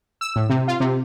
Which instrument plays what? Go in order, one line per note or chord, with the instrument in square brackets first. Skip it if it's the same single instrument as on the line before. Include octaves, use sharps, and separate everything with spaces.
[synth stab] E6
A2
C3
F4
C3